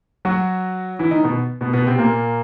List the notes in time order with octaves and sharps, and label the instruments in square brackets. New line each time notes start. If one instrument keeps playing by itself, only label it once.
[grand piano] F#3 F#4
E3 E4
D#3 D#4
B2 B3
B2 B3
B2 B3
C3 C4
A#2 A#3